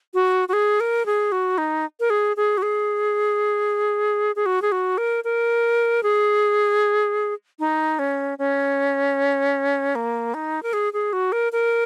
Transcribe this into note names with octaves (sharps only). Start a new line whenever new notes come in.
F#4
F#4
G#4
A#4
G#4
F#4
D#4
A#4
G#4
G#4
F#4
G#4
G#4
F#4
G#4
F#4
A#4
A#4
G#4
D#4
C#4
C#4
A#3
D#4
A#4
G#4
G#4
F#4
A#4
A#4